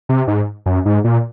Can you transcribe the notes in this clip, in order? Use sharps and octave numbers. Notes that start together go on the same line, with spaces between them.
C3
G#2
F#2
G#2
A#2